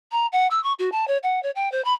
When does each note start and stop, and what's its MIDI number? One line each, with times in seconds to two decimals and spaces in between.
0.12 0.26 82
0.32 0.47 78
0.50 0.62 88
0.63 0.73 85
0.79 0.89 66
0.92 1.07 81
1.07 1.17 73
1.23 1.42 78
1.43 1.51 73
1.55 1.71 79
1.72 1.83 72
1.85 1.93 83